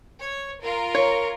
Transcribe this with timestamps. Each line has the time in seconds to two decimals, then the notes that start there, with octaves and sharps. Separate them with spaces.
0.23 C#5
0.62 F4 A#4
0.95 C#5